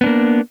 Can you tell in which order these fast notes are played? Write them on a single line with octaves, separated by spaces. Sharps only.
B3 D4 A#3